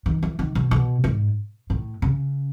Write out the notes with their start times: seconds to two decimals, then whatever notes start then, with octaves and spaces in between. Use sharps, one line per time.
0.06 D#3
0.23 E3
0.39 D#3
0.55 B2
0.71 B2
1.04 G#2
1.70 A2
2.02 C#3